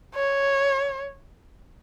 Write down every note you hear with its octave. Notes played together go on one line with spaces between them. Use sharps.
C#5